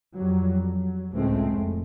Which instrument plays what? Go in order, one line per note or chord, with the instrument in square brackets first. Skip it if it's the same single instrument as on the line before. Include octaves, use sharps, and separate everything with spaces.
[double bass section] F2 F#3 G3
F#3
C#2 A2 G#3 A3 C4
F1